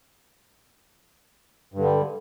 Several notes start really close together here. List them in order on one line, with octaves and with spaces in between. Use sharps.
G2 D3 G3